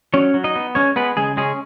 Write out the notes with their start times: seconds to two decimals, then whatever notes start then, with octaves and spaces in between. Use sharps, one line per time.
0.14 F#3 C#4 C#5
0.34 F#3
0.44 D#4 D#5
0.56 B3
0.75 G#3 C#4 C#5
0.96 G#3 B3 B4
1.17 C#3 G#3 G#4
1.37 G#3 C#4 G#4